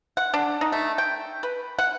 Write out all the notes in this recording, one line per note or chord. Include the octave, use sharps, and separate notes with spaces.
F#5
D4
D#4
A3
G5
B4
F#5